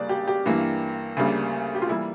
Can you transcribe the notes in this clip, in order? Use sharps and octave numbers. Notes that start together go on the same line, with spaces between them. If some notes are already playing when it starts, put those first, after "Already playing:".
Already playing: C#2 C#3 G3 A#3 D5
G4
G4
G2 E3 A#3
D2 C#3 G3 A#3
G4
F4
E3 G3 A#3 E4